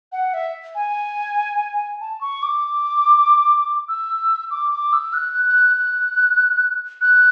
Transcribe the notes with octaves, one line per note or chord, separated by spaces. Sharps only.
F#5
E5
G#5
A5
C#6
D6
E6
D6
D6
E6
F#6
F#6
F#6
F#6